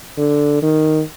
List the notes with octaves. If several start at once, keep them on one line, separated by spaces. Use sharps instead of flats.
D3
D#3